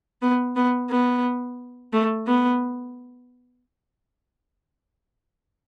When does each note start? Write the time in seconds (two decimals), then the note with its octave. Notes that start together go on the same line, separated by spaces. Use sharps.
0.22 B3
0.56 B3
0.90 B3
1.93 A3
2.27 B3